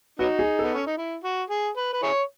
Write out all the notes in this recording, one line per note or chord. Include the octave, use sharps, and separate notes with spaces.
F#3 B3 D#4 F#4
G#4
B3 A4
C#4
D#4
E4
F#4
G#4
B4
B4
E4 G#4 C#5